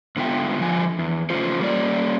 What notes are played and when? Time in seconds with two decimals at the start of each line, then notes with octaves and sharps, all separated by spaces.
0.16 G#2 D3 B3 F4 E5 G5
0.58 D3 F3 G#5
0.99 E2
1.30 C#3 A3 C#4 F4 C5
1.60 G3 A#3 C#4 D4 D5